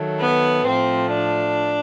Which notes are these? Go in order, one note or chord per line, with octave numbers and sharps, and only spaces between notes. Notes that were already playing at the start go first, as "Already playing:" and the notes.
Already playing: D#3 F#3 A3
B3
A2 F3 A3 C4
D4